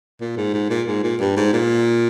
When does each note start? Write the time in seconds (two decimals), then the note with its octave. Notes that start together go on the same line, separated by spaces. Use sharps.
0.21 A#2
0.37 G#2
0.54 G#2
0.70 A#2
0.88 G#2
1.04 A#2
1.20 G2
1.37 G#2
1.53 A#2